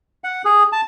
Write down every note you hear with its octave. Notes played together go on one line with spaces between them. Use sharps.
F#5
G#4
A5